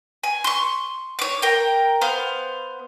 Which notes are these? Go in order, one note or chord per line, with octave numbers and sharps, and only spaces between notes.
G#5
C6 C#6
C#5 D6
A#4 G5
B3 C5 F5